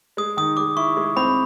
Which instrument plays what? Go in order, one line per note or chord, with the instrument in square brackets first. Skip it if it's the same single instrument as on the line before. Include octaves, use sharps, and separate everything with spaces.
[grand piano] G#3 [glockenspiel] D#6
[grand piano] D#3 [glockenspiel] D#6
[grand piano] G#3 [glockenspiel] D6
[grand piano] E4 [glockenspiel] C#6
[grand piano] G#3
[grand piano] C4 [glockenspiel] B5